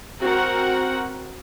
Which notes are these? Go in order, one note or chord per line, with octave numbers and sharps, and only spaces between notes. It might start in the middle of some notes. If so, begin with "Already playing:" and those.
C4 F#4 A#4 F#5